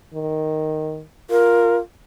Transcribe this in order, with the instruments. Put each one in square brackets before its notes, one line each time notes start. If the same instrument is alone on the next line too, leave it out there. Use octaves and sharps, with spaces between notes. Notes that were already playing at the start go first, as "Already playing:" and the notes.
[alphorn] D#3
[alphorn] F4 [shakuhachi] A#4